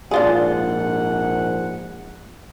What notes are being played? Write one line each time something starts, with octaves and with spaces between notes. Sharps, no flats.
A#1 G#2 D4 F4 G#4 F#5